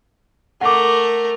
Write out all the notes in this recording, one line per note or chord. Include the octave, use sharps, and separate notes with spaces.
A3 A#4 F#5 D6